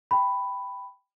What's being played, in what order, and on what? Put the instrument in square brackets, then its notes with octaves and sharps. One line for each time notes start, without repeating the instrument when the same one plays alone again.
[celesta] G5 B5